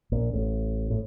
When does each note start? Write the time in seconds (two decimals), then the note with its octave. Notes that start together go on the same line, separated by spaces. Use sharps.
0.12 A#1 A#2
0.33 A1 A2
0.91 A2